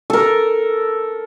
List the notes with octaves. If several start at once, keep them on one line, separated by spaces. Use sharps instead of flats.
A4 A#4